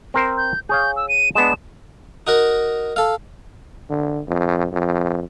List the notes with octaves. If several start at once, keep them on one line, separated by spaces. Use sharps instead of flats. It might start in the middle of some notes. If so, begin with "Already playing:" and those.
C4 A#4 C5
G6
G#4 C#5 F5 G6
E6
D#7
G#3 B3 D4 E7
D#4 F#4 A#4
A4 F5
D3
F2
F2